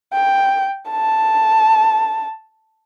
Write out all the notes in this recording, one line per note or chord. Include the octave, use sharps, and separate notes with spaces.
G5
A5